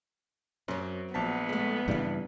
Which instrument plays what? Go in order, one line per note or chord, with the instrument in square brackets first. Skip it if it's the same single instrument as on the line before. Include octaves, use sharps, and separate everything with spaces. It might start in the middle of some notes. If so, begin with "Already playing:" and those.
[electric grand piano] F#2 [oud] F#3 C4
[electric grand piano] A#1 A5 B6 [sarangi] B3
[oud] G#3 A3
[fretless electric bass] G2 C#3 E3 [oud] G3 F5